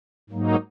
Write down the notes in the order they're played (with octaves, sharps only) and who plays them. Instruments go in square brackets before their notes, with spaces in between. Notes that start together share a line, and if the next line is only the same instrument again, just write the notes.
[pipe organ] G#2 F#3 A#3 D#4